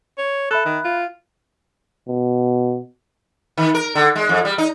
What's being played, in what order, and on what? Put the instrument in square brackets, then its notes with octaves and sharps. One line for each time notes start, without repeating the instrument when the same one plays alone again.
[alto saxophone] C#5
[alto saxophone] A4 [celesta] E5 B5 F#6
[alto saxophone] D#3
F4
[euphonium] B2
[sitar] D#3
A#4
D3
G#3
F2
G3
D#4